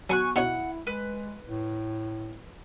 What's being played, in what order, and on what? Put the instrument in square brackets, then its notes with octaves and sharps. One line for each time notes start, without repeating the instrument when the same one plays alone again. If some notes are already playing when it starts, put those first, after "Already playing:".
[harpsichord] F#3 [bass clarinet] B3 [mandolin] G#5 C#6 F#6
[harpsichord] B2 D#4 C#5 [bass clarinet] E4 [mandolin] F#5
[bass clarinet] G#3 [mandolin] B4
[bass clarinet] A2